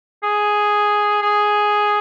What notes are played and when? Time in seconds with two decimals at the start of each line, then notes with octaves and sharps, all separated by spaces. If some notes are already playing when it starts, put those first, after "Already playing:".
0.23 G#4
1.22 G#4